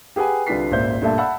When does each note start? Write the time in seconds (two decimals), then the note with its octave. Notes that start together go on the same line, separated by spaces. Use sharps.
0.16 G4 G#4 B4 F#5 G#5
0.47 C2 D3 F4 B4 B6 C7
0.71 G#1 C#2 A#2 C5 E5 G6
1.01 G2 A#2 A3 A#3 E5 A5
1.18 E5 F#5 A5 B5 E6